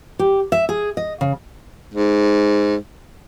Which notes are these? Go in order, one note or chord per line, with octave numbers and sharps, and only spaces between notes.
G4
E5
G#4
D#5
C#3
G#2